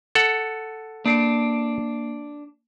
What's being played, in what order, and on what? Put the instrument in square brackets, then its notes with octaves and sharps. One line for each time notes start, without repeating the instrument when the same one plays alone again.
[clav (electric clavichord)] A4 F#5
[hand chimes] A#3 C7 D7 [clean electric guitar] D4